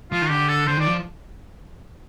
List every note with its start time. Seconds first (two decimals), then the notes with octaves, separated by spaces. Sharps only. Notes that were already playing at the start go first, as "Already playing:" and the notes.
0.11 F3 F4
0.22 D#3
0.30 D3 G4
0.48 A4
0.67 D3 C5
0.77 D#3 D5
0.87 F3